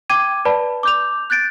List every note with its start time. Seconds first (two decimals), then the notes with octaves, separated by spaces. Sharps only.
0.10 G5 D6 G#6 D#7
0.45 B4 D5 A5 B5
0.83 D6 G6 F7
1.30 F#6 G6 A6 D7